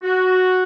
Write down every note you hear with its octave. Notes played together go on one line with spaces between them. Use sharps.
F#4